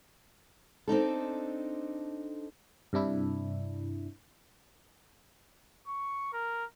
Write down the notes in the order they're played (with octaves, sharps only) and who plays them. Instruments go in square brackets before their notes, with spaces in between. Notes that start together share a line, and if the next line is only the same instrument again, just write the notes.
[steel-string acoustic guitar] C4 D4 D#4 A4
[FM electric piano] G2 C3 D4 E4
[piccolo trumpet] C#6
A#4